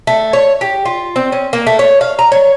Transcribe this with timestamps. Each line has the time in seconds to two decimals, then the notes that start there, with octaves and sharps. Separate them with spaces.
0.07 A3
0.33 C#5
0.61 G4
0.86 F4
1.16 C4
1.32 C#4
1.53 A#3
1.67 A3
1.79 C#5
2.01 F5
2.19 A#5
2.32 C#5